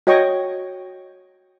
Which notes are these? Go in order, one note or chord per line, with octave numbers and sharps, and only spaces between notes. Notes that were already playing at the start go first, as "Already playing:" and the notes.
F#4 C#5 D#5 G5 C#6